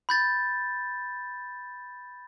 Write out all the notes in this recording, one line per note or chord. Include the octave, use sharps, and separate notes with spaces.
B5 G6 A6